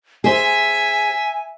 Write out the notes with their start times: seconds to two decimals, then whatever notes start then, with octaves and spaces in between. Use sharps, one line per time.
0.24 G#4 C5 E5 G#5